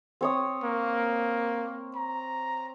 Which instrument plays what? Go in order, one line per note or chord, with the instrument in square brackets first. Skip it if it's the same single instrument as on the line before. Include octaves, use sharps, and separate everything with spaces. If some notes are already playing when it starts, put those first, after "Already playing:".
[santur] C4 C#5 D#6
[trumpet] A#3
A#5